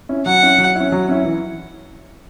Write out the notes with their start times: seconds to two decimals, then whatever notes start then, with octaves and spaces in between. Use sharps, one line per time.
0.09 C#4 E4
0.26 F#3 F#5
0.42 C#4 E4
0.58 F#3
0.75 C#4 E4
0.92 F#3
1.09 C#4 E4
1.25 E3